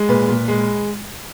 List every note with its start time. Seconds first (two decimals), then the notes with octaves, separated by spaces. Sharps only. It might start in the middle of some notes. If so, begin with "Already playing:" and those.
Already playing: G#3
0.09 A#2 B4
0.28 A#2
0.48 G#3